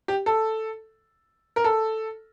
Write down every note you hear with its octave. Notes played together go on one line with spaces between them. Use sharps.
G4
A4
A#4
A4